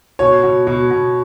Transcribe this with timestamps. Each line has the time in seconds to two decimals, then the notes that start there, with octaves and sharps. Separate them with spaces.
0.19 B2 C#5
0.43 B2
0.67 B2
0.91 B2